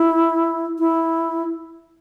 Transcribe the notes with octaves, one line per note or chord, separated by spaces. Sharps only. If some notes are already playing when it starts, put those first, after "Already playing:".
Already playing: E4
E4